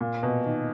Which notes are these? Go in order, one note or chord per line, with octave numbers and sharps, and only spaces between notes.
A#2
B2
D#3